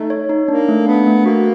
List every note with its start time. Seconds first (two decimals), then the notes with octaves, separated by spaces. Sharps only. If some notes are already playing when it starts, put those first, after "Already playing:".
Already playing: A3 D#4
0.10 C#5
0.29 D#4
0.48 A#3 D4
0.68 A3
0.87 B3 D4
1.06 A3
1.25 A#3 F#4